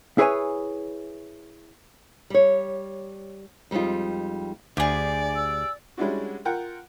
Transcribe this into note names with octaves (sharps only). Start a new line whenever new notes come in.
E4 G#4 B4 C#5 G5 G#5
G3 C#5
F2 G3 G#3 D#4 F4
D2 G4 G#4 D5
E6
G3 G#3 C#4 D4 E4 F#4
F4 A#4 F#5 G5